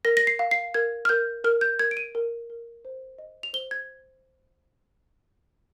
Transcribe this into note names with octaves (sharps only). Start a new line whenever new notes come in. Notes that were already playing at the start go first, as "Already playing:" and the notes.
A#4 A#6
A#6
C7
F5
C7
A#4 G#6
F6
A#4 G6
A#4 F6
G6
A#4 G#6
D7
D#7
A#4
A#4
C5
D#5
F7
C5 G7
G#6